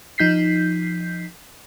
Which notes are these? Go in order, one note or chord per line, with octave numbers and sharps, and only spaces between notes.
F3 D#4 G6 B6 C7